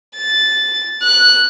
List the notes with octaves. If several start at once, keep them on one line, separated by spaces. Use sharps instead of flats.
A6
F#6